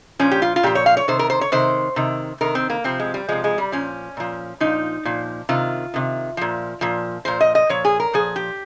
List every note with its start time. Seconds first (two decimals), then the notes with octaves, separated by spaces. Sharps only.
0.19 A#2 F3 C#4
0.31 G4
0.42 F4
0.56 F4
0.63 A#2 F3 G4
0.75 C#5
0.86 F5
0.97 C#5
1.08 C3 D#3 C5
1.19 A#4
1.30 C5
1.41 C#5
1.52 C3 D#3 C5
1.96 C3 D#3
2.41 C3 D#3 A#4
2.55 C4
2.70 A#3
2.84 C3 F3 C4
3.00 G#3
3.14 G3
3.28 C3 F3 G#3
3.44 G#3
3.58 G3
3.72 A#2 F3 C#4
4.17 A#2 F3
4.60 A#2 F3 D#4
5.05 A#2 F3
5.49 C3 D#3 F4
5.94 C3 D#3
6.37 A#2 F3
6.81 A#2 F3
7.25 A#2 F3 C5
7.41 D#5
7.55 D#5
7.69 A#2 F3 C#5
7.85 G#4
8.00 A#4
8.13 A#2 F3 G#4
8.36 G4